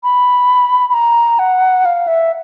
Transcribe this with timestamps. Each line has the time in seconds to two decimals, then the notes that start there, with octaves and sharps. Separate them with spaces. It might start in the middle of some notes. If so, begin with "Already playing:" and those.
0.03 B5
0.90 B5
0.94 A#5
1.39 F#5
1.85 F5
2.07 E5